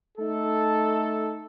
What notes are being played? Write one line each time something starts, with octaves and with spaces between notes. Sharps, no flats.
A3 D#4 A4